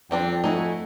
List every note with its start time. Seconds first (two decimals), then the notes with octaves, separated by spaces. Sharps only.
0.11 F2 G3 C4 D4 G5
0.44 A3 D#4 E4 F#4 G#5